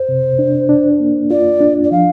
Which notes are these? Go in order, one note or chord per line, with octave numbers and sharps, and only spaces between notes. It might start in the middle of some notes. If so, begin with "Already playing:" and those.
Already playing: C5
C3
D4
D4
A#3
F4 D5
D4
D5
F3 F5